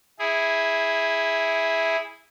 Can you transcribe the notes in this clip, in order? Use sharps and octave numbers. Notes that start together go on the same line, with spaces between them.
E4 G#4